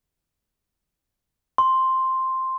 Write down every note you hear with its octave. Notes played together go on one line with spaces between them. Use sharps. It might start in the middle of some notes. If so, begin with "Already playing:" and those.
C6